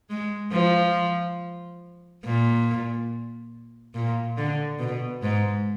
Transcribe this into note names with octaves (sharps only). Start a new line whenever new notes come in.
G#3
F3
A#2
A#2
D3
B2
G#2